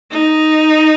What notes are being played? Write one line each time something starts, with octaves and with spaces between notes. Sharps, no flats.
D#4